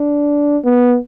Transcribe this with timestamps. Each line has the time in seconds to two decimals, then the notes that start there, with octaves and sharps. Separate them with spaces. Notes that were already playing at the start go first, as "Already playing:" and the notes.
Already playing: D4
0.65 B3